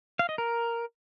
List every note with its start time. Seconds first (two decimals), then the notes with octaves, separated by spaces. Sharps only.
0.19 F5
0.29 D#5
0.38 A#4